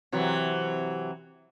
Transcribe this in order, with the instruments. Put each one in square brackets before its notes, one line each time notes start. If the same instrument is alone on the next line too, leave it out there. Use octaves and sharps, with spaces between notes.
[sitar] C3 E3 F#3